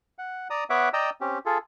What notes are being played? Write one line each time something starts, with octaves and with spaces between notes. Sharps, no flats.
F#5
D5 A#5 D#6
B3 C#5 E5 F#5 D6
D5 D#5 G5 A#5 D#6 E6
C4 C#4 G4
F4 G#4 A4